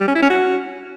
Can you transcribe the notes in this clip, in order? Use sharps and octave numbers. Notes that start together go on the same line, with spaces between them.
G3
C#4
E4
C#4
F#4